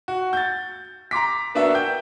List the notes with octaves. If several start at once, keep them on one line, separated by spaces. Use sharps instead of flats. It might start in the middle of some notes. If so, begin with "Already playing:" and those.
F#4
G6 A6
A#5 C6 D6 B6
A#3 B3 D4 F#4 E5 F#5
G5 G6